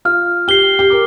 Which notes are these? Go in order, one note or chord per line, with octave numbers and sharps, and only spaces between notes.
F4 F6
G4 C7 G7
G4
A#4 D6